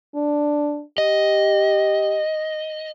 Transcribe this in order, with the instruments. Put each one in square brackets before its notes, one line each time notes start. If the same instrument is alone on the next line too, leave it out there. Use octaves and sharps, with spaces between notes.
[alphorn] D4
[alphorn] G4 [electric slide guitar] D#5